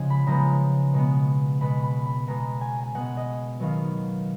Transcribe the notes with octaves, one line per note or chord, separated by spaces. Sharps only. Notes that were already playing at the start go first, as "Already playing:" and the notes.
Already playing: C#3 F3 G#3 G#5
B5
C#3 F3 G#3 B3 A#5
B2 G#3 B3
B2 G#3 B3 B5
B5
B5
B2 G#3 B3 A#5
G#5
G#5
B2 G#3 B3 F#5
D#5
D#3 F#3 B3 F5